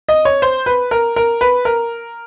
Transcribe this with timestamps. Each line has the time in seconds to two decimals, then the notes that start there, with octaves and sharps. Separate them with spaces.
0.09 D#5
0.25 C#5
0.42 C5
0.66 B4
0.91 A#4
1.16 A#4
1.41 B4
1.65 A#4